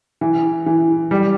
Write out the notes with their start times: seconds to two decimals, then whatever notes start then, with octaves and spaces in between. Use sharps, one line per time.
0.21 E3
0.66 E3
1.11 G3